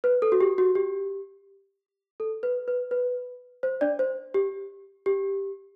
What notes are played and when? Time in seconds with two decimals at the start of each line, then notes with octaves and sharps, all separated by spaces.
0.04 B4
0.22 A4
0.32 F#4
0.41 G4
0.58 F#4
0.75 G4
2.20 A4
2.43 B4
2.68 B4
2.91 B4
3.63 C5
3.81 D4 D5
3.99 C5
4.34 G4
5.06 G4